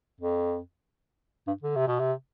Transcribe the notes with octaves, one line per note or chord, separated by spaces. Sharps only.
F2
G2
D3
C3
B2
C3